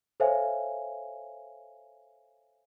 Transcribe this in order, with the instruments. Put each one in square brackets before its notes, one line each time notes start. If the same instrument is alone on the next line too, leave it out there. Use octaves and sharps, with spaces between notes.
[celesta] A4 C5 C#5 E5 F5 G#5